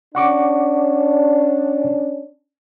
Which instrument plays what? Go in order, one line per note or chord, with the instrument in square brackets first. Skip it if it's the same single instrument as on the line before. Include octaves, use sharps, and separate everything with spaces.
[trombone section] C#4 D4 [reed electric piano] F#5 C#6 D6